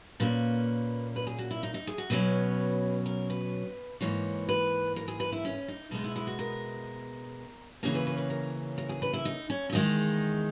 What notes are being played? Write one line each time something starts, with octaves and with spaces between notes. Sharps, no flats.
A#2 A#3 C#4 B4
B4
G#4
F#4
E4
D#4
D#4
G#4
F#4
B2 F#3 C#4 B4
A#4
B4
G#2 E3 A#3 C#5
B4
A#4
G#4
B4
E4
C#4
D#4
B2 G#3 B3 D#4
E4
E4
F#4
A#4
C#3 E3 A#3 C#4 G#4
B4
B4
B4
A#4
A#4
G#4
B4
E4
D#4
C#4
C#4
E2 D#3 G#3 D#4